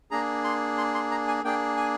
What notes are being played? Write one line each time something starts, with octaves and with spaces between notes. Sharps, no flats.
A#3 D4 G#4 A#5
C6
C6
C6
A#5
G#5
A#3 D4 G#4 G5
G#5